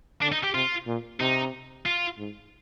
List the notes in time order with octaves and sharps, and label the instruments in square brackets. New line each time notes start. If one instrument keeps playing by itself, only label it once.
[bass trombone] D3 [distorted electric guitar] D4
[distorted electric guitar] D#4
G4
[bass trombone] C3 [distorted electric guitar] F4
[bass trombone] A#2
[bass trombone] C3 [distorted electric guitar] D#4
[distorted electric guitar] F4
[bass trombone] G#2